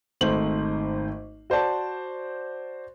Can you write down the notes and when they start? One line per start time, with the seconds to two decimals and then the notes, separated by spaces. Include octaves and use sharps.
0.21 G#1 G#2 A3 C5 F#7
1.50 F#4 C5 D5 A5